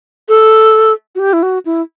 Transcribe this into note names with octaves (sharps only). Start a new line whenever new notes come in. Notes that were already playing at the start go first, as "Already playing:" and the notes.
A4
F#4
G4
E4
F#4
E4